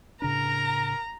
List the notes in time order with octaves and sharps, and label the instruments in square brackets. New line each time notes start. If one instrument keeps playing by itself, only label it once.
[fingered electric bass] A2 C#3 D4 [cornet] A#4 [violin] A#5